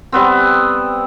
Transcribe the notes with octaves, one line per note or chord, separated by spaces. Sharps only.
G3 B3 C4